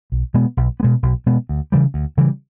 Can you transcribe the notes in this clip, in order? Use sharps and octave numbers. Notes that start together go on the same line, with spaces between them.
B1
B2 G#3 B3
B1
B3
B2 G#3
B1
B2 G#3 B3
D2
C#3 E3 G3
D2
C#3 E3 G3